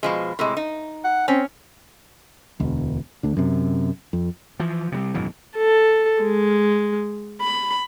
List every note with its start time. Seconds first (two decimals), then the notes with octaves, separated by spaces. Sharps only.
0.03 B2 F3 G#3
0.39 A2 C3 G#3
0.57 D#4
1.04 F#5
1.28 C4 C#4
2.60 E1 D2
3.23 D2 D3
3.37 F#2 C3
4.13 F2
4.60 E3 F3
4.92 C3 F#3 G3
5.14 G#1 F#2 B2 E3
5.57 A4
6.22 G#3
7.42 B5